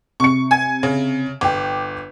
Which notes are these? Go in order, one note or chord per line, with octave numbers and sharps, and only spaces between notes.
C3 C#6 C#7
G#5 G#6
C#3
G1 G5 D6